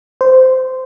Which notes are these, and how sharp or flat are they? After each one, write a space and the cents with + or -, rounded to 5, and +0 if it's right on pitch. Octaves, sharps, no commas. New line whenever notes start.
C5 -15